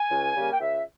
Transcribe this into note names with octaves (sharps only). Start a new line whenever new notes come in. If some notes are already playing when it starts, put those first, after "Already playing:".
Already playing: G#5
C#2
C#3 G3 A#3
G5
C#2 E5